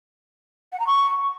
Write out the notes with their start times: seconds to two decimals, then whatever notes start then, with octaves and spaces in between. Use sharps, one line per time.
0.72 F#5
0.79 A#5
0.87 C#6